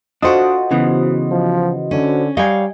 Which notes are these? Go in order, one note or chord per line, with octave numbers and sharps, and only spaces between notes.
D4 F4 F#4 A4 C5 D#5 F#5
C#3 E3 B3
F3
D3 C#4
G3 C#5 D#5 F5 G5 G#5